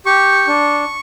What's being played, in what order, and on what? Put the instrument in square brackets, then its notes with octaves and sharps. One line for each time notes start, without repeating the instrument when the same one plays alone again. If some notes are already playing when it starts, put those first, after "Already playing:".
[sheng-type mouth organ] G4 C#6
D4